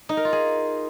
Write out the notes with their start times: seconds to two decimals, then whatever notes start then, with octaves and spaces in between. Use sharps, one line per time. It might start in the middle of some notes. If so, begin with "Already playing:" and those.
0.09 D#4
0.17 A#4
0.25 F4
0.33 G#4